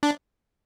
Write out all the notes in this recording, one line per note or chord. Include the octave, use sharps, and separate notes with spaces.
D4